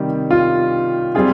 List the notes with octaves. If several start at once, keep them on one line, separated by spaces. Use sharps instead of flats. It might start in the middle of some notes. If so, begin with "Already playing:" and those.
Already playing: C3 D#3 G3
F4
G3 C4 F4 G#4